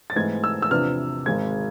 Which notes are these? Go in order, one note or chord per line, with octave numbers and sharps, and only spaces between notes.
A6
G#2 E3 A3 C4 G#6
E6
E6
E2 C3 F3 B3 D4 F6
G#1 G#2 G#3 C4 G#6